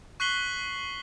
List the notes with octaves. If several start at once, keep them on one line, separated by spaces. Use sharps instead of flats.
C#6 F#6 B6 C7 F#7 G7